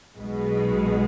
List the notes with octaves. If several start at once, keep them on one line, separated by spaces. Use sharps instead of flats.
B1 B2 G#3